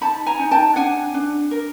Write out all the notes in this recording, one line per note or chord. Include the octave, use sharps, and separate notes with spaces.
D#4 A5 B5
G#5 A#5
D#4
G5 A5
D4 F#5 G#5
D4
A#4